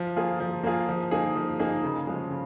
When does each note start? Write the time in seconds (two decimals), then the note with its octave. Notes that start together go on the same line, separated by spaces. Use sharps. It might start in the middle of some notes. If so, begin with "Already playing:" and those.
Already playing: F3
0.16 A#3 F4 G#4
0.40 F3
0.64 A#3 F4 G#4
0.89 F3
1.11 A#3 D#4 G#4
1.35 F3
1.59 A#3 D#4 G#4
1.84 C#3
2.07 F3 G#3
2.30 C#3